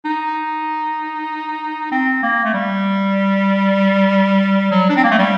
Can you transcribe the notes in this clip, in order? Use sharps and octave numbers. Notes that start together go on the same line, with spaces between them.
D#4
C4
A#3
A3
G3
F#3
D4
C4
A#3
A3
G3